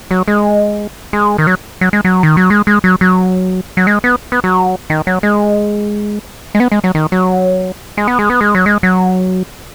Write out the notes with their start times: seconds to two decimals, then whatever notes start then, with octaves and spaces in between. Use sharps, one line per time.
0.11 F#3
0.28 G#3
1.13 G#3
1.38 D#3
1.47 F#3
1.81 F#3
1.93 G#3
2.05 F#3
2.23 D#3
2.37 F#3
2.50 G#3
2.67 G#3
2.84 F#3
3.01 F#3
3.77 F#3
3.87 G#3
4.04 B3
4.32 B3
4.44 F#3
4.90 D#3
5.07 F#3
5.23 G#3
6.55 G#3
6.60 B3
6.72 G#3
6.84 F#3
6.95 D#3
7.12 F#3
7.97 G#3
8.08 B3
8.19 G#3
8.30 B3
8.41 G#3
8.55 F#3
8.66 G#3
8.83 F#3